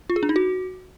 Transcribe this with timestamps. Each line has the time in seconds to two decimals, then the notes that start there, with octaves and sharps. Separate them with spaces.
0.10 F4
0.16 G#4
0.23 D4
0.29 D#4
0.36 F#4